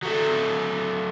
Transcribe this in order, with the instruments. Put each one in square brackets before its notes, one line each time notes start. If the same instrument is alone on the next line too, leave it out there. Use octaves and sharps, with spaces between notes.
[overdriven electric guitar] F#3 A3